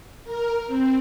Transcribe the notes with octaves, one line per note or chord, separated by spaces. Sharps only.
A#4
C4